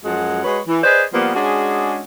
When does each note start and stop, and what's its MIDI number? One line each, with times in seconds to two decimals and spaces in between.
0.04 0.42 42
0.04 0.42 53
0.04 0.42 56
0.04 0.42 66
0.04 0.42 78
0.44 0.59 56
0.44 0.59 66
0.44 0.59 71
0.44 0.59 73
0.68 0.82 52
0.83 1.03 68
0.83 1.03 71
0.83 1.03 72
0.83 1.03 74
0.83 1.03 75
1.12 1.32 53
1.12 1.32 55
1.12 1.32 58
1.12 1.32 59
1.34 2.02 56
1.34 2.02 61
1.34 2.02 62
1.34 2.02 66
1.34 2.02 68